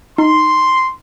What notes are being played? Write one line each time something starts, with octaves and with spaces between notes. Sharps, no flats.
D#4 C6